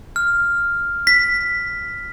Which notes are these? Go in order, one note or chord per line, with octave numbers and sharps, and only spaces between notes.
F6
B6